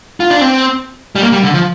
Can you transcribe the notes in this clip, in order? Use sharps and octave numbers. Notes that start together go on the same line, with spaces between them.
F4
D4
C4
G3
A#3
G3
D3
F3